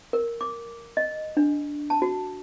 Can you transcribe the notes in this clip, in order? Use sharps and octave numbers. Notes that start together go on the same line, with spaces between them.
A#4
D6
D#5
D4
A5
F#4